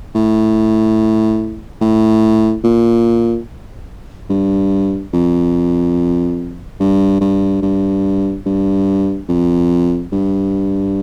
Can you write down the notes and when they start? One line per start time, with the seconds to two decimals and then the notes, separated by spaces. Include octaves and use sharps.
0.15 A2
1.81 A2
2.64 A#2
4.30 G2
5.13 F2
6.80 G2
7.21 G2
7.62 G2
8.46 G2
9.29 F2
10.12 G2